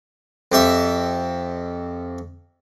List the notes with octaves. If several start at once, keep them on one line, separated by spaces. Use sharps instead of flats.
F2 G4 E5